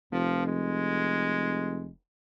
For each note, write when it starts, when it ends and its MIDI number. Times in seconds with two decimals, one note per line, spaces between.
0.12 1.92 29
0.12 0.42 53
0.46 1.91 56